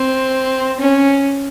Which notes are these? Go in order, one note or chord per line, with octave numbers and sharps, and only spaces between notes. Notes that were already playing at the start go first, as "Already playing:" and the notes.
Already playing: C4
C#4